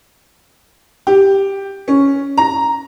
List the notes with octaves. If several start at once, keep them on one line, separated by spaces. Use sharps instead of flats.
G4
C#4
A#5